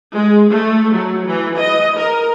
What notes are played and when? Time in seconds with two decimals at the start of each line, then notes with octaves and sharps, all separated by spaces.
0.14 G#3
0.51 A3
0.94 F#3
1.26 E3
1.58 D#5
1.99 A#4